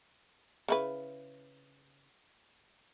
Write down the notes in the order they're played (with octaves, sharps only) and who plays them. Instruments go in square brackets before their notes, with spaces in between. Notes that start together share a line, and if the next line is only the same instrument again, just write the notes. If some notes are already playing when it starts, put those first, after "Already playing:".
[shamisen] C#3 E4 B4